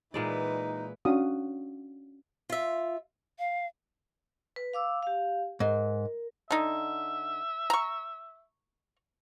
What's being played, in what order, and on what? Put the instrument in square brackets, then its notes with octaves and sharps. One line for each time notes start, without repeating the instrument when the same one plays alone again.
[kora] A#2 G#3 D5 [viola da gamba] E3 B4 [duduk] D#4
[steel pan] C#4 D4 F#4 F5 D#6
[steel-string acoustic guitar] F4 E5
[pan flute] F5
[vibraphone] B4
F5 D6 E6
G4 F5
[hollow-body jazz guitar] G#2 [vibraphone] A#4
[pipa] D3 D#4 [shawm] E5
[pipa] A#5 C#6